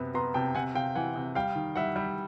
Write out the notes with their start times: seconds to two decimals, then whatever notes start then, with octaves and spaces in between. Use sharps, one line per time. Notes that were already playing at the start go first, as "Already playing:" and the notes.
Already playing: F#2 C3 B3
0.14 B3 A#5 C6
0.34 C3 G5 A5
0.55 C3 F#5 G#5
0.75 C3 F5 G5
0.95 E3 F#5 G#5
1.16 C3
1.35 G3 F5 G5
1.56 D#3
1.76 G3 E5 F#5
1.96 G3